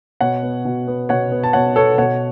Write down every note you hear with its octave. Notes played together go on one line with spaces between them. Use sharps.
B2 C#5 F#5
B3
B2
B3
B2 C#5 F#5
B3
A5
B2 C#5 F#5
B3 A4 C#5
B2 C#5 F#5